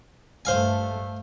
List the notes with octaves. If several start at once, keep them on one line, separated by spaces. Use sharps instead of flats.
G2 A3 C5 F5 G#5